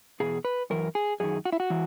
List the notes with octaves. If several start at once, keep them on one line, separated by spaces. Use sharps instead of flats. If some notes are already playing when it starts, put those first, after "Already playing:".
E2 B2 G#4
B4
F#2 E3 A#4
G#4
F#2 D#3 G#4
F#4
E4
F#4
E3